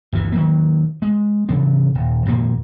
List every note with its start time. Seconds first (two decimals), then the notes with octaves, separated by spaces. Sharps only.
0.13 G1 D2 E3
0.32 D#3 F#3 A#3
1.02 G#3
1.49 C3 E3 F#3 D4
1.95 D#1
2.26 G#1 F2 A#2 A#3